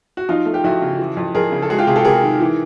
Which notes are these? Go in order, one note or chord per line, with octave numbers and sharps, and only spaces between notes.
F#4
F3 D#4 F4
A3
G4
F2 E4 F#4
C#3
E3
F2
F2 G#4 A#4
C#3
A4
G#3 F#4 G#4
F4 G4
C3 F#4 G#4
G4 A4
C3 G#4 A#4
D#3
E3